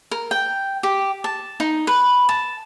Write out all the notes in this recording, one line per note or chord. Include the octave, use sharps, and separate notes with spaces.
A#4
G5
G4
A5
D#4
B4
A5